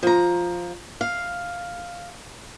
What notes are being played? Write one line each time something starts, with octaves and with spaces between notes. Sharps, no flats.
F3 A#5
F5